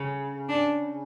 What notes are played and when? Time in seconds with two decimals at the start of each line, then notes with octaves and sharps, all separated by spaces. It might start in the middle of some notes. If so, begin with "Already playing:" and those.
Already playing: C#3
0.49 D4